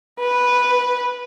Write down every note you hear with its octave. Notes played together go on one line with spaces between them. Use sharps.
B4